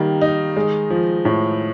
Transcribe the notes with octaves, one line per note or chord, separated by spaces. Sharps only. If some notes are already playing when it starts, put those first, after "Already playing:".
Already playing: D#3 G3 A#3
D#4
G#3
F3
A2